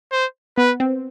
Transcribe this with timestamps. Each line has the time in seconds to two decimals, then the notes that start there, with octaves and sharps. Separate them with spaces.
0.12 C5
0.58 B3 B4
0.80 C4